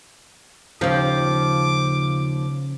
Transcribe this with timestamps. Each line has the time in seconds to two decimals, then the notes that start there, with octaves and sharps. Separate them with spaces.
0.81 D#2 C#3 F3 D6